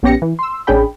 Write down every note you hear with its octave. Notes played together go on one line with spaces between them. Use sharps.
A#1 B3 C#4 G4 A#6 C#7
E3
C6 E6
A1 C#4 D4 G#4 G5 B5